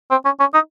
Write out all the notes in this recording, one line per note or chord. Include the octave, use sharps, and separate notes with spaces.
C4
C#4
C#4
D#4